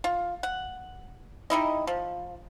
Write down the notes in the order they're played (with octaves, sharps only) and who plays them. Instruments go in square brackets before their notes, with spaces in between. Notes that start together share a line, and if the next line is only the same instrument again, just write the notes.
[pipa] F4
F#5
G3 D#4 E4 D#5
F3